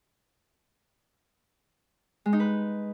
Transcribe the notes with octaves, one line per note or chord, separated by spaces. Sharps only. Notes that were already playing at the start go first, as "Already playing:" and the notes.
G#3
D#4
B4